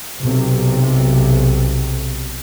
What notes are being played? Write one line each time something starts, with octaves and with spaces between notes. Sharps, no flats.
B1 C3